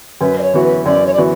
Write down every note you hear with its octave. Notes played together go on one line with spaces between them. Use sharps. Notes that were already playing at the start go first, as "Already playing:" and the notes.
F#2 B4
D5
C#5
E3 B3 F#4
B4
F#2 D5
C#5
D5
E3 B3 F#4